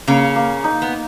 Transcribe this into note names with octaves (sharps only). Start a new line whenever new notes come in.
C#3 A#3 C#4
A#3
D#4
B3